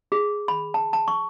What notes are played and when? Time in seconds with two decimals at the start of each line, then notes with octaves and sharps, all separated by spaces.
0.12 G#4
0.48 B5
0.74 A5
0.93 A5
1.08 C#6